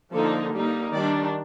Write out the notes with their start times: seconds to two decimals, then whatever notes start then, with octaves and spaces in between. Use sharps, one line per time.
0.14 D3 F3 A#3 D#4 A4
0.53 G3 A#3 D#4
0.92 D#3 G3 D4 D5